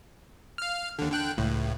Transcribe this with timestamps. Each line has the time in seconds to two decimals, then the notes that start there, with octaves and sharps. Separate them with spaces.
0.58 F5 F6
0.99 D#2 D3
1.12 D3 G5 F#6
1.37 C#2 A2